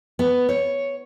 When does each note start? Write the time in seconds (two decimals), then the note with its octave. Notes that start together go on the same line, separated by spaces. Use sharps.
0.19 B3
0.49 C#5